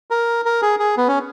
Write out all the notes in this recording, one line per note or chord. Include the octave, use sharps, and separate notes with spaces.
A#4
A#4
G#4
G#4
B3
C#4